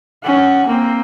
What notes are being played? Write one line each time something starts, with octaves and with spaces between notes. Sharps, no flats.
C#4 F#5
A#3 C4